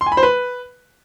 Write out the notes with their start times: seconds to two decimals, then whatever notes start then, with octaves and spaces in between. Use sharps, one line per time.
0.01 C6
0.06 G#5
0.12 B5
0.17 C5
0.23 B4